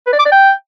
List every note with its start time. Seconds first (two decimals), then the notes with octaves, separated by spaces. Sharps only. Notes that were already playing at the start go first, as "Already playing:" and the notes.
0.07 B4
0.13 D5
0.19 D6
0.26 D5
0.32 G5